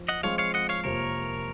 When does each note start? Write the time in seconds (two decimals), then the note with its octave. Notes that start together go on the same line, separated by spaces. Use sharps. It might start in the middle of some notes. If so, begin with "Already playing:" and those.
Already playing: F3
0.08 D#5 F#5
0.23 F3 G#3 C4 F4 C#5 F5
0.38 C#5 F5
0.54 D#5 F#5
0.69 C#5 F5
0.84 F2 C3 F3 A#3 A#4 C#5